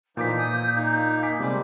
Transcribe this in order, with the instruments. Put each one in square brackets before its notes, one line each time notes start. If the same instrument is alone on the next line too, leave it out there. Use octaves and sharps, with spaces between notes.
[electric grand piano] A#2 D6 B6 [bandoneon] E3 F3 D#4 [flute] G6
[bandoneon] D#6
A#3 D#4
[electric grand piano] G#5 D6 B6
[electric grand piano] C3 [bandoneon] G3 G#3 [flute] D6